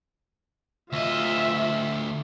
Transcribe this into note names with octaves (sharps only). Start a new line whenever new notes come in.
D2 F4 D#5 E5